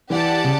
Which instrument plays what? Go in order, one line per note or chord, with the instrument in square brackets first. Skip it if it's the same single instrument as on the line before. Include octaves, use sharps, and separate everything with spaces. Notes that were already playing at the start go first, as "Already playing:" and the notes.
[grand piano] E3 [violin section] G4 D5 F#5 A5
[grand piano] C#3